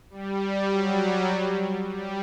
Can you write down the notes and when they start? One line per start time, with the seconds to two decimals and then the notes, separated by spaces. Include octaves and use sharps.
0.10 G3
0.71 F#3
1.92 G3